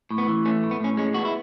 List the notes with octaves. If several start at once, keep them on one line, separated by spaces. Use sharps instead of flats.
A2
B3
E3
A3 C#4
A2
B3
A2 C#4
G#3 C#4
B3 F#4
E4